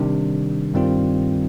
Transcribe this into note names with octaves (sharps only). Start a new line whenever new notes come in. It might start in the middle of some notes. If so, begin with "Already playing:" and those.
Already playing: C3 D#3 G3 D4
G2 D#3 G3 C4 F4